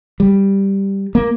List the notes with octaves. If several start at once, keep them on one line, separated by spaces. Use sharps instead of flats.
G3
A#3